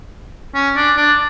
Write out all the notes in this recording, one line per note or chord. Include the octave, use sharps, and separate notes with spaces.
C#4
D4
D4